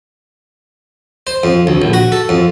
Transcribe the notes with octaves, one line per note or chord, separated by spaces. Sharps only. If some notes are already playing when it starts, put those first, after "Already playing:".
C5
F2
D2
A#1
F#4
A4
F2